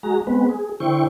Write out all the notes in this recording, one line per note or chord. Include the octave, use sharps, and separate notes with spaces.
G#3 F#4 G#4 A#5
G#3 B3 C4 B4
G#4
D3 E4 C5 G5 C#6